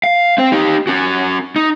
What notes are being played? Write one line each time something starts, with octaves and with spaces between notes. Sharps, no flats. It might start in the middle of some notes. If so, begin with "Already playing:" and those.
F5
C4 C5
D#4 G4
C#4 F#4
D#4